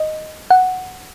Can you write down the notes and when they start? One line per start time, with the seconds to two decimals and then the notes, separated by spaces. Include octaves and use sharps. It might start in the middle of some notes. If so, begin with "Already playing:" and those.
Already playing: D#5
0.51 F#5